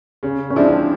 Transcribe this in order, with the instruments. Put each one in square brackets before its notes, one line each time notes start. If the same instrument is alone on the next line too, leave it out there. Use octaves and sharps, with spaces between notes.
[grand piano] C#3 [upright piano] C#4
[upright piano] C#4
[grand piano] F3 G#3 C4 E4 [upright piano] D4